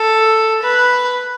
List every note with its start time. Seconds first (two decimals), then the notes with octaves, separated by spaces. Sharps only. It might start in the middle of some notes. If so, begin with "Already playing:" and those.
Already playing: A4
0.63 B4